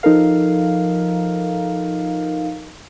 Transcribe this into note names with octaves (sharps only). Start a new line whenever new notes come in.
F3 D#4 A4 A#4 F5